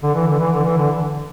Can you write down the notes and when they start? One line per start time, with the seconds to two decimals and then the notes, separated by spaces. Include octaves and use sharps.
0.02 D3
0.15 E3
0.27 D3
0.39 E3
0.52 D3
0.65 E3
0.78 D3